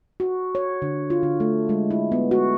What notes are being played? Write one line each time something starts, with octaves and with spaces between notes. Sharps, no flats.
F#4
C#5
D3
F4
D3
A3
G#3
E4
B3
F#4